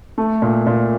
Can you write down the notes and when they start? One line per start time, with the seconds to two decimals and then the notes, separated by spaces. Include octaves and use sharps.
0.18 A3
0.42 A#2
0.67 A#2